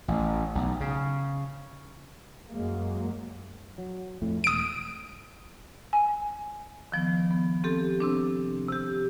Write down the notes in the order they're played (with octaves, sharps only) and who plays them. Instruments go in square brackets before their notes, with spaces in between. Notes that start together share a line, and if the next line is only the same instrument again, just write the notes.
[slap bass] A1
B1
C#3
[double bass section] F#2 F#3 G#3 A#3
[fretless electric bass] F#3
F2 A2 A3
[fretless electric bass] E1 [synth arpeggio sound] D#6 D7
[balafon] G#5
[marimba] D#3 F3 B3
B3
C4 G4 A4
C3 C4 D4
C3 G4